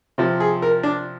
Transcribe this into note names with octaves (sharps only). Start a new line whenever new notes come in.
C3 F3
G#4
A#4
D4